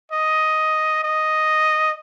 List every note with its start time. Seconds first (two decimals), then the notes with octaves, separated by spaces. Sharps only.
0.12 D#5
1.03 D#5